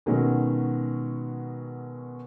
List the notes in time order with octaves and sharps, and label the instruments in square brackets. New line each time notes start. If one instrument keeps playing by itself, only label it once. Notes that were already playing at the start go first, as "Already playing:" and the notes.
[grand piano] B2 D#3 F#3 G#3 B3 C#4